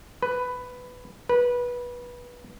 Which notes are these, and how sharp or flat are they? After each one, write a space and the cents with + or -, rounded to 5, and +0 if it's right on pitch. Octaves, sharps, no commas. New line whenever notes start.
B4 +10
B4 -20